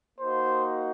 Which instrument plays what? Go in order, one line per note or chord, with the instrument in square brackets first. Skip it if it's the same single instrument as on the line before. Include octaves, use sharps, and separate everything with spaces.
[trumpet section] A#3 D#4 F#4 C5